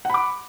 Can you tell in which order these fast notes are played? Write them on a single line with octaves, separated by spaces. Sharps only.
F#5 B5 D6